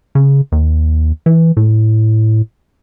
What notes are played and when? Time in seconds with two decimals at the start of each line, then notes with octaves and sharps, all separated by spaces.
0.15 C#3
0.52 D#2
1.26 E3
1.57 A2